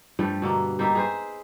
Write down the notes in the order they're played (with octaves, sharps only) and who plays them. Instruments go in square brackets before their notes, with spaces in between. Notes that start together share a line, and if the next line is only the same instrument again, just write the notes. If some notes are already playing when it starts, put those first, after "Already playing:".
[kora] G2 F3 G3 A3
B2 D3 A#3
G3 A#3 D#4 E5
G#4 B4 C5